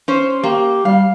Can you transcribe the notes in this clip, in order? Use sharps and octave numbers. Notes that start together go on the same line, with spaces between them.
C#4 C5
A#3 G4
G3 F5